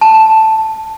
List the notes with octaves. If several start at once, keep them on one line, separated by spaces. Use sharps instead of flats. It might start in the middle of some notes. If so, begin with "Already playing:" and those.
A5